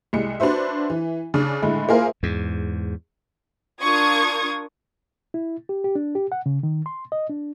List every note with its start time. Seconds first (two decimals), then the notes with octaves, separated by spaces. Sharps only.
0.13 C2 G#3 C#7
0.40 D4 F#4 B4 C5 E5
0.90 E3
1.34 C#3 D4
1.62 A2 D3 G#3 A3
1.89 A#3 E4 F4 G#4 A#4 C5
2.23 E2 G#2
3.82 D4 F4 A#4 C#6 D#6 G#6
5.34 E4
5.69 G4
5.84 G4
5.95 D4
6.15 G4
6.32 F#5
6.46 C#3
6.63 D#3
6.86 C6
7.12 D#5
7.29 D4